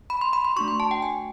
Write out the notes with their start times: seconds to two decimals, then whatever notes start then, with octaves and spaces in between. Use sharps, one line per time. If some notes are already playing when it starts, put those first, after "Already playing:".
0.10 B5
0.21 C6
0.33 B5
0.45 C6
0.56 A3 D4 F#4 C#6
0.68 C6
0.80 A5
0.91 G5
1.02 G#5